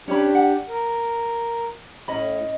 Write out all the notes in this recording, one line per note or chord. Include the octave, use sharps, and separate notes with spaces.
C#4 D4 G4 C#5 B5
F#5
A#4
A2 C#4 D#5 B5